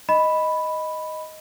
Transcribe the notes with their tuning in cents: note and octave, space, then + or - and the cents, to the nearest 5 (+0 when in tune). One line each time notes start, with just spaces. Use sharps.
D#5 +5 B5 +0